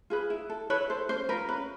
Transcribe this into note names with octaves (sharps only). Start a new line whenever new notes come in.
F4 G#4 B4
E4
A4
E4 B4 C#5
A4 C5
C#4 C5
F4 A#4 B4
C#4 B4